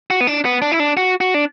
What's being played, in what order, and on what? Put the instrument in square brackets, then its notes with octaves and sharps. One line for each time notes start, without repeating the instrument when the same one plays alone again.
[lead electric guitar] F#4
B3
D4
B3
D4
E4
D4
F#4
F#4
D4